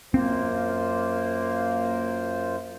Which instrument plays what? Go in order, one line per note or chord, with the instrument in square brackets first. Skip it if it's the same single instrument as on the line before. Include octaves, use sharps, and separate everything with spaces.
[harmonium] F#2 F4 C5 [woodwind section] A#3 [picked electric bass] C4